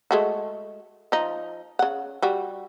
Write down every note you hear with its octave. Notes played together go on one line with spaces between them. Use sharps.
G#3 A3 F#4
F3 D#4
C#3 F#5
G3 F#4